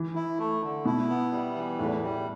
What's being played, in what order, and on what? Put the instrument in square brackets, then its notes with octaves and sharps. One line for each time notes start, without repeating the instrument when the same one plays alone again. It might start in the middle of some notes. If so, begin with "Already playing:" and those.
Already playing: [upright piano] E3
[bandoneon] E4
A3
D3
[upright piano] B2 [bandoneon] E4
[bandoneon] B3
G3
E3
[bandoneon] E2 [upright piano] A2
[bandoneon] G3